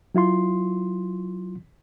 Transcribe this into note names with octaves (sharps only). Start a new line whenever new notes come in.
F#3 E4 F4 C6